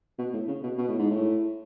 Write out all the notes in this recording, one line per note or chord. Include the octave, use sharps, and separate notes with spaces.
B2
A2
C#3
B2
B2
A2
G#2
A2